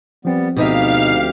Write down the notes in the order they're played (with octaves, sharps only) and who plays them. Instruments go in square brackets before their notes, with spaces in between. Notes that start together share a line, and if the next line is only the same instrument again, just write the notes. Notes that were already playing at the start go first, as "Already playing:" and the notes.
[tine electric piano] F3 C4 [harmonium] G3 B3
[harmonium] D2 G4 [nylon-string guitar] B2 D#4 E5 [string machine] F5